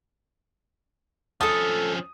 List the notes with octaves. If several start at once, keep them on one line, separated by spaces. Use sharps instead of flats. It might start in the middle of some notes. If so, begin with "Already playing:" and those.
F3 C#4 A4 A5 D#6